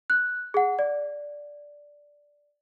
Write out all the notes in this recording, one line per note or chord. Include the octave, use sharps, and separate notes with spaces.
F#6
G#4 F#5
D5